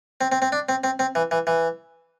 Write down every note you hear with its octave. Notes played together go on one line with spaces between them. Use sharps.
C4
C4
C4
D4
C4
C4
C4
E3
E3
E3